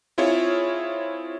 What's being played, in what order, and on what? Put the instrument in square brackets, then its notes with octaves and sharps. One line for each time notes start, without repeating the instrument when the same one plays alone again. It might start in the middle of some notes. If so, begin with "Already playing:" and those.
[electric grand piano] C4 E4 F4 G#4 C#5